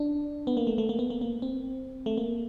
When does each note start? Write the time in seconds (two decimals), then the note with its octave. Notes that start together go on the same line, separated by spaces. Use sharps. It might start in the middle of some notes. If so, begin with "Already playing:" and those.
Already playing: D4
0.47 B3
0.57 A#3
0.67 A3
0.78 A3
0.89 A#3
0.99 B3
1.10 A#3
1.21 A#3
1.42 C4
2.06 A3
2.18 A#3